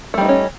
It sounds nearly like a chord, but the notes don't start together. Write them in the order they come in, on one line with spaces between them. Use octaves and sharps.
A3 G3 D#4 B3 C#4